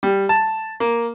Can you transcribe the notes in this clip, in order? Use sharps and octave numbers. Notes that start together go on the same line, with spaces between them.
G3
A5
A#3